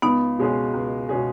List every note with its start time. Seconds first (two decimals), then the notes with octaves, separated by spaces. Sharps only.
0.02 C#2 B3 D#4
0.38 B2 G#3 C#4 G#4
0.74 C#2
1.09 B2 G#3 C#4 G#4